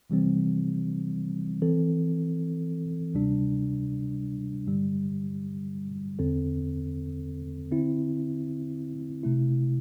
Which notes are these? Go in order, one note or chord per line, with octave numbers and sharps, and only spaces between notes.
C3 E3 G3 C4
E3 C4 A4
D2 C3 G3 D4
G2 D3 G3
E2 D3 C4 A4
D3 C4 E4
C3 A3 E4